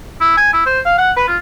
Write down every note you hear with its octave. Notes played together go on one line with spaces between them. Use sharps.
E4
G#5
E4
C5
F5
F#5
B4
F4